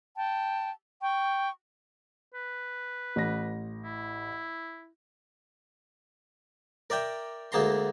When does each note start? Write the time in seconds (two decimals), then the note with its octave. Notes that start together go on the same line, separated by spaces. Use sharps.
0.16 G5 A5
1.01 G5 C#6
2.34 B4
3.16 A1 A#6
3.83 E4
6.90 A#4 D5 E5 G5 A#5
7.52 D2 G#3 A#3 A5 A#5 C6